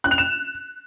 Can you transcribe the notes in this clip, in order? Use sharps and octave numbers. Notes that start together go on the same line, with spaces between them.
F#6
F7
E7